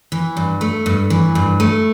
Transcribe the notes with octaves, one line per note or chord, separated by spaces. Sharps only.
E3
G2
A3
G2
E3
G2
A3